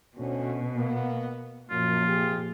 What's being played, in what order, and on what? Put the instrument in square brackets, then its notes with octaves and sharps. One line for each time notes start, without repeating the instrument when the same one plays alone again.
[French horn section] D2 C#4 [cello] B2
[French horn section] A#3 B3
[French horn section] F#2 [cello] A#2 F3 [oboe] F4
[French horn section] C3 G4 G#4